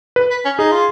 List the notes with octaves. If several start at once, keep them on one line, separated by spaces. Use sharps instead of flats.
B4
B4
C#4
D#4 G#4
F4